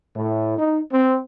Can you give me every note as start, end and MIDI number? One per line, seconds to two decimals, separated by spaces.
0.16 0.58 45
0.59 0.80 63
0.92 1.18 60